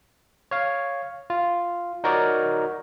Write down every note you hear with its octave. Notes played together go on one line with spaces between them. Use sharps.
C#5 F5
F4
D#4 F#4 A#4 C#5 D5